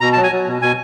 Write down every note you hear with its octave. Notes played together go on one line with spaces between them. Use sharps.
B2 A#5
A5
F#3
G#5
F#3
B2
B2 G#5